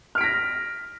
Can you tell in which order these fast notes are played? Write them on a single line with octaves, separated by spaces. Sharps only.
F6 D7 B6 A#6